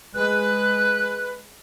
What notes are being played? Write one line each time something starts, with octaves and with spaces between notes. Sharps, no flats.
G#3 B4 F#6